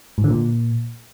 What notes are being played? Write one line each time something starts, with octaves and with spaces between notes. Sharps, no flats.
G#2
D3
A#2